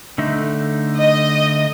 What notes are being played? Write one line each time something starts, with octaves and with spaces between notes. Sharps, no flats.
D3 A3 D#4
D#5